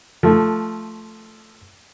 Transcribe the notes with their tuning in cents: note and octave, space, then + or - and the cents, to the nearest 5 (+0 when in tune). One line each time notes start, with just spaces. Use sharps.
F3 +0 A3 +0